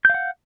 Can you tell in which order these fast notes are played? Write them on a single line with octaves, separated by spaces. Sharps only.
G6 F5 F#5